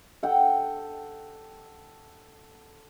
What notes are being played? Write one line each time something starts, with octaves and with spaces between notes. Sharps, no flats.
A4 F#5 G5